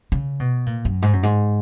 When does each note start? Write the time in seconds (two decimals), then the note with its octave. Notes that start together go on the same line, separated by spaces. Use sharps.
0.12 C#3
0.40 B2
0.66 A#2
0.85 F#2
1.02 G#2
1.13 F#2
1.23 G#2